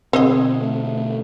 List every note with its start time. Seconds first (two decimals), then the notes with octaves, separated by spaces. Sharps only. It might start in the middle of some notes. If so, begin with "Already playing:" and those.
0.13 B2 D3 C4 G#4 D#5
0.61 A3